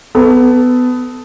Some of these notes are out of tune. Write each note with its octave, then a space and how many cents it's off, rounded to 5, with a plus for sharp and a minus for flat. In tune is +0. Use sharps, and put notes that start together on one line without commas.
B3 +20 A4 +0